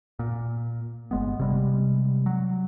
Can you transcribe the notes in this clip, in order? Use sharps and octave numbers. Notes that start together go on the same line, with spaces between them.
A#2
G1 G#3 B3
C3 G3 G#3
F#3